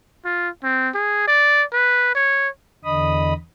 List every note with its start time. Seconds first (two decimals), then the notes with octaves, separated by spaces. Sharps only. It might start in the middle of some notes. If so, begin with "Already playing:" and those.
0.25 F4
0.63 C4
0.94 G#4
1.27 D5
1.73 B4
2.15 C#5
2.84 E2 D3 D#5 B5 D#6